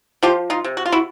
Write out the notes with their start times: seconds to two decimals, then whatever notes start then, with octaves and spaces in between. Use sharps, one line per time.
0.23 F3 F4 G4
0.50 D#4 F4
0.64 C3
0.77 F#4
0.86 F4
0.92 E4 F#4